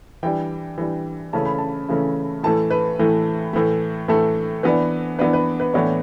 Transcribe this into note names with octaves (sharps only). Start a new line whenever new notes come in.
E3 G3 D4 G5
E3 G3 D4
C#3 E3 A3 C#4 A5
B5
A5
C#3 E3 A3 C#4
A2 E3 A3 A5
B4
A2 E3 A3
A2 E3 A3
A2 E3 A3 A4
E3 B3 D4 B4
E3 B3 D4 B4
B4
B4
A2 E3 B3 D4 C#5